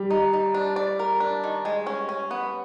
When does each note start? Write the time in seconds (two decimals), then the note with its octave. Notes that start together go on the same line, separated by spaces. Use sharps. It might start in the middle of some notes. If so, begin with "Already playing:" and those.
Already playing: G3
0.10 D#4
0.33 D#4
0.54 D4
0.76 D5
0.99 A#4
1.20 D4
1.44 D#3
1.65 G#3
1.87 C#4
2.09 C#4
2.31 B3